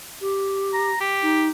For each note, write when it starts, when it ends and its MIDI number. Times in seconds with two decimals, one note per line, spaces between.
0.21 0.90 67
0.73 0.99 82
1.01 1.48 67
1.22 1.49 63